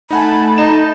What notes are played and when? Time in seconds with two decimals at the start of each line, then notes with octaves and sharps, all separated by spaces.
0.11 A3 D#4 F#5 G#5 A5 B5
0.58 D#4 E7